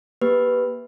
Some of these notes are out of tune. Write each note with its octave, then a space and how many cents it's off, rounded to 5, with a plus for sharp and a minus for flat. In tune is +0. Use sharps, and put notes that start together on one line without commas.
A#3 +30 G4 +0 B4 +0